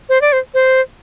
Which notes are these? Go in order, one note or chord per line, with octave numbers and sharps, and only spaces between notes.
C5
D5
C5
C5